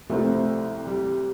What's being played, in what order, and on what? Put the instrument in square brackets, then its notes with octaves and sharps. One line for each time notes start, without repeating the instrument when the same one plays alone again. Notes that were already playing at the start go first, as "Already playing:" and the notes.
[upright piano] C2 C3 F3 C4 F4 [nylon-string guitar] A3
[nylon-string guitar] G3